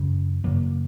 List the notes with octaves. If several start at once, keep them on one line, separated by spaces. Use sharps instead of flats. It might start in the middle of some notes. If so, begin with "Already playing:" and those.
Already playing: F#2 C#3
F#2 C#3 F#3 A#3